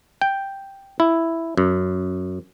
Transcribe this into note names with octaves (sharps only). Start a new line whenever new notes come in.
G5
E4
F#2